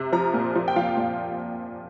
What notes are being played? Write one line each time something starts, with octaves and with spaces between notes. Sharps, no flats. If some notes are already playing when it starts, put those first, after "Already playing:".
Already playing: C3
F3 A#5
A#2
F3
G5
F3 F5
A#2